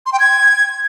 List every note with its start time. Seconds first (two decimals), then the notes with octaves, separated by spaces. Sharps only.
0.06 C6
0.13 G5
0.20 G#6